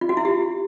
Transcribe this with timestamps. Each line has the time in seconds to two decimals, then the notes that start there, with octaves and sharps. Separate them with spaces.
0.01 F4
0.09 F#4
0.17 E4
0.25 G4